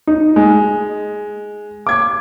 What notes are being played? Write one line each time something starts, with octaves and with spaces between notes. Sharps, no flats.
D#4
G#3
D6 G#6